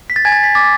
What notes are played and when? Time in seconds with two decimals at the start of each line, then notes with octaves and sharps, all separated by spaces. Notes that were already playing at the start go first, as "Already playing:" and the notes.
0.10 B6
0.16 A6
0.25 G#5 G#6
0.32 A6
0.43 B6
0.55 D6 A6